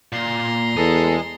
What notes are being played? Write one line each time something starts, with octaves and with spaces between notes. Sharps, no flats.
A#2 A#5 C6
E2 G#4 A4 D#5